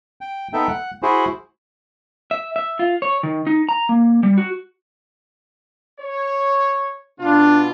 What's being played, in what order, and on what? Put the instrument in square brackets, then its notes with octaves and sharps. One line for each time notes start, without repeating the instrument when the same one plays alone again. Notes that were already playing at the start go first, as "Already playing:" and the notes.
[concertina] G5
B3 D#4 A4 E5 G5
F#5
E4 F#4 G#4 C5
[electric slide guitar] E5
E5
F4
C#5
D#3
D#4
A#5
A#3
G3
F#4
[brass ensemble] C#5
[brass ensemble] B2 F4 [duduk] D4